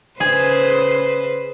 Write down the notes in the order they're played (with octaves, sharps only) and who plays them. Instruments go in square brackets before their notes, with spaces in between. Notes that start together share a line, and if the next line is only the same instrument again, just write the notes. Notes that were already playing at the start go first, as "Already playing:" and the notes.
[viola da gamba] C#3 B4 C5 [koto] G#4